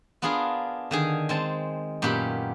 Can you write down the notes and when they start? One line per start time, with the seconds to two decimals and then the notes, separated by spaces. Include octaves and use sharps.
0.22 B3 D4 F4 G#4 A#4
0.91 D3 D#3 G#4
1.29 G#3 C4 A5
2.02 F#2 A#2 B3 G4 B5